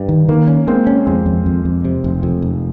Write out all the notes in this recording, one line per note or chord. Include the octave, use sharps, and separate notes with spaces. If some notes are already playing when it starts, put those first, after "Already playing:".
Already playing: G2 G4
D#3
D#3 A#3
C#4
G#3 A#3 C4
C#4
F2 G#3 C4
F2
F2
F2
C3
F1
F2
F1